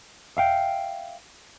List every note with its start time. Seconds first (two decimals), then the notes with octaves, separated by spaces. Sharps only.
0.37 E5 F5 G5